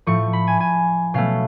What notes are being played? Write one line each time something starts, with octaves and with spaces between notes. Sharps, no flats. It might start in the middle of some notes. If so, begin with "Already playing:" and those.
A2 F3 A3 C#6
B5
G#5
G#5
B2 F#3 A3 C#4 F5